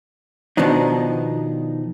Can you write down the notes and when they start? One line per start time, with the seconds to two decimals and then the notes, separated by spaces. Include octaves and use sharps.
0.57 B2 D#3 F3 B3 D4 D#4